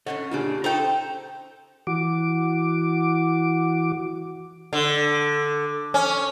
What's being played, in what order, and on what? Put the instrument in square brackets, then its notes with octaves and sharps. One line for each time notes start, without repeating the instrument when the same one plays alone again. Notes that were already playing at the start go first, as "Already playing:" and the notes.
[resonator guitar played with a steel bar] C#4 C5 C#5 [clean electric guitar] A4 D#5 F#5
[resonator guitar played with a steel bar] A#2 C#3 D4 [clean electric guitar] F4 G4 G#4
[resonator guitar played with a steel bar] C#4 D#4 A#5 [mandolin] A4 G5 [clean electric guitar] C5
[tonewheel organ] E3 F#4 D6
[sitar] D3
C#4